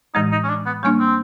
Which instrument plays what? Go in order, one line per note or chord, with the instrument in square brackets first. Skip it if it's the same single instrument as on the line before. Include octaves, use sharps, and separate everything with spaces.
[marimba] A2 E3 G#3 [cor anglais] D#4
[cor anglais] D#4
C#4
D4
B3
[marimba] G3 A#3 D4 [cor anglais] C#4
[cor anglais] C4